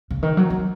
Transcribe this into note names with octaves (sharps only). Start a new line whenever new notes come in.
C#3
D#3
F#3
F#3